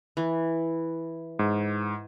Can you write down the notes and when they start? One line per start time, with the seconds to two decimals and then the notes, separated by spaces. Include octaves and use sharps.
0.17 E3
1.39 G#2